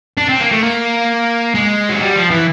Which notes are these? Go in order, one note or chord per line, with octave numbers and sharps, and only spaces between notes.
D4
C4
A#3
A3
A#3
G#3
F#3
G3
F3
E3